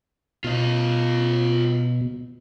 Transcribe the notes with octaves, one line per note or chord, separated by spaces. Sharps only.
B2 F4 D#5